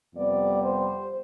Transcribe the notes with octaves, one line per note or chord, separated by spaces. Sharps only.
F2 C3 G3 B3 D5
C5